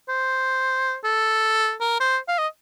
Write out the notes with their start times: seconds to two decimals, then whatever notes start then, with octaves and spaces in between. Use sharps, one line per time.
0.09 C5
1.04 A4
1.81 A#4
2.00 C5
2.28 F5
2.38 D#5